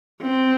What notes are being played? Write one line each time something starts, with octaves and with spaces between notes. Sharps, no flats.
C4